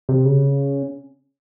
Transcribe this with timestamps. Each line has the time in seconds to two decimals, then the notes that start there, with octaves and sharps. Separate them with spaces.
0.09 C3
0.25 C#3